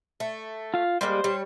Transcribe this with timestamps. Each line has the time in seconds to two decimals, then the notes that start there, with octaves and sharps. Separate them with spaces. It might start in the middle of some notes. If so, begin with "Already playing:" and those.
0.20 A3
0.74 F4 F5
1.01 G3 G#3 A#3 C5
1.24 G3 C#5